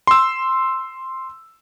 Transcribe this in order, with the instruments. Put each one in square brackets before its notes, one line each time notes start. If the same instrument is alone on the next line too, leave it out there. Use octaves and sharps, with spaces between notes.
[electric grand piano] C6 E6